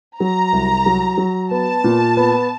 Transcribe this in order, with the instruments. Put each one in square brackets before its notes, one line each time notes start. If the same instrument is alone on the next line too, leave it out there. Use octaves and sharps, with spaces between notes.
[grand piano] F#3 [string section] A#5
[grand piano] C2
F#3
F#3
[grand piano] B3 [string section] A5
[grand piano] A#2
B3